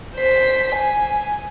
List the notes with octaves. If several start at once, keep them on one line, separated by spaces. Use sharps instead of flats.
C5 B6
G#5